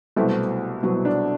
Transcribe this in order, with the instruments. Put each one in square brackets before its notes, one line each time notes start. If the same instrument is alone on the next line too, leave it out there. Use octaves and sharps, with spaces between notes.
[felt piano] C2 B2 F#3 C4 E4 [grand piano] A3
[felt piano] C2 B2 F#3 C4 E4
[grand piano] D4